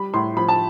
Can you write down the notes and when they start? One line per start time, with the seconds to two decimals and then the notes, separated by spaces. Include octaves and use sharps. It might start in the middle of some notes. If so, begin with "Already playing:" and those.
Already playing: G3 B5
0.14 A2 C6
0.37 F3 B5
0.48 A5